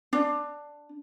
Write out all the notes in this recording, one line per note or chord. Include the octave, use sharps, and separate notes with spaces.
D4